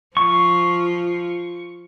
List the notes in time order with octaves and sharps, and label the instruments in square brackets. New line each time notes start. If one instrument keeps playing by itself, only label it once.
[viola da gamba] F3 F4 [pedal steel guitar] C#6